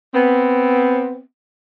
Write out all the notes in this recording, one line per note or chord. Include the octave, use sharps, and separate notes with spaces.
B3 C4